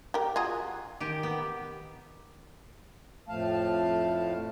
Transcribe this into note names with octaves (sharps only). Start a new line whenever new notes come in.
G4 A#4
F4 F#4 G#4
D#3 G4
B3
F2 A2 F3 A3 F5 A5